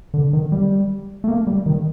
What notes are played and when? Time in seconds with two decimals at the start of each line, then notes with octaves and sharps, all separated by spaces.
0.14 D3
0.33 D#3
0.52 G3
1.24 A3
1.28 A#3
1.47 G3
1.66 D#3